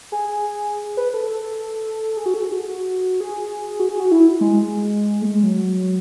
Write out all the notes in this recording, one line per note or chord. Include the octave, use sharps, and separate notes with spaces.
G#4
B4
A4
G#4
F#4
A4
G#4
F#4
G#4
F#4
G#4
F#4
E4
G#3
A3
G#3
F#3